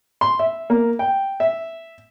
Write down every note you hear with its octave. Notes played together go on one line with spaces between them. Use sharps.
C6
E5
A#3
G5
E5